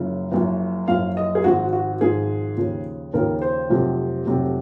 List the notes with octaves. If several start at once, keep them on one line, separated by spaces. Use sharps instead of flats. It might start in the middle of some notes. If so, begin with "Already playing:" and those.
Already playing: F#1 F#2 C#3 F3
F#1 F#2 F3
F#1 F#2 F3 F5
D#5
G#4
G#1 G#2 F3 F#4
F#4
G#1 G#2 F3 G#4
D#2 C#3 F3
D#2 C#3 F3 A#4
C5
F1 F2 C3 F#3
F1 F2 C3 F#3